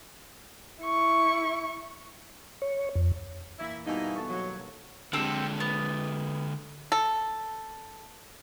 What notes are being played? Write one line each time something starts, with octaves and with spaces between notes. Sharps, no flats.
E4 C#6
C#5
F2
A#2 E3 E4
G2 B2 E3 A#3 D#4 G#5
B3 A4 C#6
D#2 F#3
D3 G#3 C4 G4 A4
B3
A4